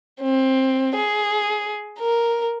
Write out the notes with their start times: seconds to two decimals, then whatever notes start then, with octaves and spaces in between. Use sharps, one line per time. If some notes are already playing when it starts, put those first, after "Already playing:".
0.21 C4
0.95 G#4
1.99 A#4